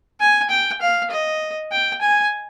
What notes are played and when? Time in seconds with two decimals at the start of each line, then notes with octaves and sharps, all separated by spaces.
0.20 G#5
0.50 G5
0.81 F5
1.10 D#5
1.71 G5
2.01 G#5